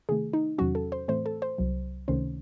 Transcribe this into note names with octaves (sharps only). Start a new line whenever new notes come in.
C3 D#3 A3 G#4
D#4
E2 C3 D#3 F#3 C#4 F#4
A4
C5
A2 E3 A3 C4 C5
A4
C5
C2 C3 F#3
C#2 C3 D#3 A3 C#4 C5